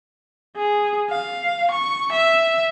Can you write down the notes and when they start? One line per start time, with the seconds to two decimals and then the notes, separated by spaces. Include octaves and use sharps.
0.56 G#4
1.10 F5
1.71 C#6
2.12 E5